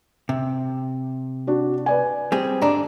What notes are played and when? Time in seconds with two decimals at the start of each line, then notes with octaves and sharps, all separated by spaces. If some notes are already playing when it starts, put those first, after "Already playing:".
0.29 C3
1.47 D4 F#4
1.86 B4 D5 G#5
2.32 G3 C4 G#4
2.62 G#2 D3 D4 D5 A#5